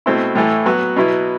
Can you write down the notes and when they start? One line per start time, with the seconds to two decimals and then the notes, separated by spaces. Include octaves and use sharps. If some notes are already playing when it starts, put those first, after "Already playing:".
0.06 B2 A3 C4 E4
0.35 A2 E3 A3
0.65 F#3 B3 F#4
0.96 B2 F#3 B3 E4